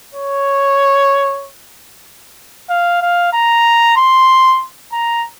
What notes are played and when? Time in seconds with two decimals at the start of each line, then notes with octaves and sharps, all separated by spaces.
0.15 C#5
2.69 F5
3.02 F5
3.33 A#5
3.97 C6
4.92 A#5